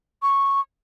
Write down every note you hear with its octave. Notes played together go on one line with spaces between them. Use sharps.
C#6